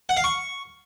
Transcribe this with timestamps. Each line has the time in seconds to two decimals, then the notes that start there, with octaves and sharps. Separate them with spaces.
0.09 F#5
0.17 F5
0.24 C#6